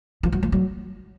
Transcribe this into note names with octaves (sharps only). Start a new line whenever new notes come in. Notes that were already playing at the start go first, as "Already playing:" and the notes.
F3
F#3
F3
F#3